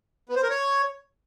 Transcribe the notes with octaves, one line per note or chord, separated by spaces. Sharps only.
B3
C5
A#4
C#5